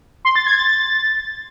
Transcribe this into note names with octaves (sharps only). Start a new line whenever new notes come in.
C6
A6
G#6
A6
A6